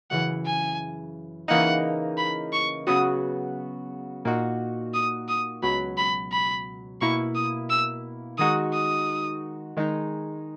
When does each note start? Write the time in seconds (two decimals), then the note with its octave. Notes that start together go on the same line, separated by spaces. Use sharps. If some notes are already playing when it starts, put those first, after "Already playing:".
0.11 F#2 C#3 E3 F#5
0.46 G#5
1.48 C#3 E3 A#3 D#4 F#5
2.17 B5
2.53 C#6
2.87 C#3 F#3 B3 F#4 D#6
4.25 A#2 A#3 D#4 F#4
4.94 D#6
5.29 D#6
5.62 C#2 B2 F#3 B5
5.98 B5
6.32 B5
7.01 B2 A#3 E4 C#6
7.35 D#6
7.70 E6
8.38 D#3 G#3 D#4 F#4 D#6
8.73 D#6
9.77 D#3 G#3 D#4